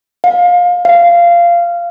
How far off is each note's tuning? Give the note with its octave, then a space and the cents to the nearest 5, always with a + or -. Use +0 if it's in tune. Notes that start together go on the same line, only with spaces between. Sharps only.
F5 +25
F5 -15